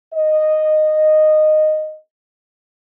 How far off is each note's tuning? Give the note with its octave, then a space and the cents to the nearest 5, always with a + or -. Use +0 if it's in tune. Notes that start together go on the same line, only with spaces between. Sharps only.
D#5 -10